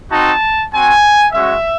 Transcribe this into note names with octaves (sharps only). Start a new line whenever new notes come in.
C4 D#4 F#4 A5
C4 F#4 G#5
G#3 C#4 F#4 E5